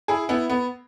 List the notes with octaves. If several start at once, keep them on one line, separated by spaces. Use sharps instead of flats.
E4 G#4
B3 E4
B3